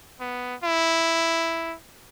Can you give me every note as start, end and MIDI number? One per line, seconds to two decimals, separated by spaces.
0.21 0.55 59
0.64 1.75 64